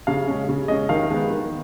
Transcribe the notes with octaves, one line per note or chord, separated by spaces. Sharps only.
C#3 F5
G#3 C#4
C#3
G#3 C#4 D#5
D#3 F5
G#3 B3
D#3